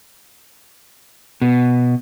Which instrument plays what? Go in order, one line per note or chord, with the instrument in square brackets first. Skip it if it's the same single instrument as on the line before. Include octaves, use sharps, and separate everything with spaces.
[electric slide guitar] B2